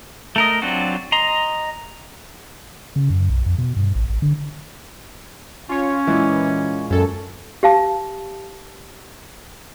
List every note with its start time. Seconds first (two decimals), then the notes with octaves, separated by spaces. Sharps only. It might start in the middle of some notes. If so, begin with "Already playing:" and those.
0.36 A3 A#4 D#5
0.62 F#3 C4 D4 F4 F#4
1.12 D#5 A#5 C6
2.96 C#3
3.10 F#2
3.30 B1
3.46 F2
3.58 B2
3.76 G2
3.95 A1
4.10 A1
4.22 D3
5.69 C#4 F4 C#5
6.07 A#2 E3 G#3
6.90 F#2 C#4 A4
7.63 G4 F5 A5